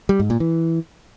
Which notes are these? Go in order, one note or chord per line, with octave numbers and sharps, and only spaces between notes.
G3
G#2
A#2
E3